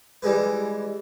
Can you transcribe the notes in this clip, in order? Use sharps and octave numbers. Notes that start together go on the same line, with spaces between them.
E3 G3 G#3 B4